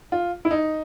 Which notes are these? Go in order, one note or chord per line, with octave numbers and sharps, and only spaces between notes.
F4
E4
D#4